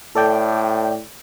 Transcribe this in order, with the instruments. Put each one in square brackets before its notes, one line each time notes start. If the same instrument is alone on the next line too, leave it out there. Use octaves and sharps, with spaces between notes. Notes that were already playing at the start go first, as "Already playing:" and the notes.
[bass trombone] A2 [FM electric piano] A4 D5 G5